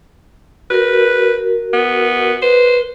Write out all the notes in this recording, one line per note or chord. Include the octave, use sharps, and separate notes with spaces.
F#4 A#4 B4
B3
B4 C5